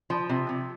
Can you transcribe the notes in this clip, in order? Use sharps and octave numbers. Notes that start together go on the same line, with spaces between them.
F3
C3
C3